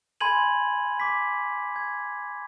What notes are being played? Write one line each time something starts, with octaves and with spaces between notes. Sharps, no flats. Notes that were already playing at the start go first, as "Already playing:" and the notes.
G#5 B5 C6 G#6 D#7 F#7
D6 B6
G#6